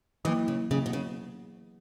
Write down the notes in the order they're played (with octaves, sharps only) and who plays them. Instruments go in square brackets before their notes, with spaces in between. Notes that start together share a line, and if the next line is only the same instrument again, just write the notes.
[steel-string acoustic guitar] E3 [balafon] F#3 A#3 E4
[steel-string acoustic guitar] C#3
[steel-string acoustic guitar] C#3 [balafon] F#3 A#3 E4
[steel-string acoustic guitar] B2
C#3